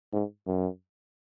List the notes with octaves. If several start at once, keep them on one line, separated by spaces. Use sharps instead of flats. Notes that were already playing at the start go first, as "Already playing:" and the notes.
G#2
F#2